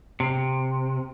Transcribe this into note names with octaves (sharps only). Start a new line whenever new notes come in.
C3